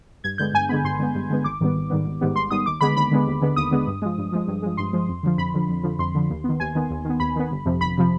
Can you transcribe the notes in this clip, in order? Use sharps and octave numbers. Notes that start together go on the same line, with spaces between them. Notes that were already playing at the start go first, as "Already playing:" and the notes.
G2 G#6
D3 G#3 B3 G6
G2 G#5
D3 G#3 B3 B5
G2 C6
D3 G#3 B3
G2
D3 G#3 B3
G#1 D6
G#2 D#3 G3 B3
G#1
G#2 D#3 G3 B3
G#1
G#2 D#3 G3 B3
G#1 C6
G#2 D#3 G3 B3 D#6
D#2 D6
D3 G#3 B3 B5
D#2 B5
D3 G#3 B3
D#2
D3 G#3 B3
D#2 D#6
D3 G#3 B3
G2
F3 G#3
G2
F3 G#3
G2
F3 G#3
G2 C6
F3 G#3
F2
D3 F3
F2 B5
D3 F3
F2
D3 F3
F2 C6
D3 F3
D#2
D#3 B3
D#2 G#5
D#3 B3
D#2
D#3 B3
D#2 B5
D#3 B3
G1
F2 C3 F3
G1 B5
C3 F3